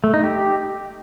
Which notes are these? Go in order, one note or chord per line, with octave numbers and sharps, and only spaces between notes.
A3
D#4
G4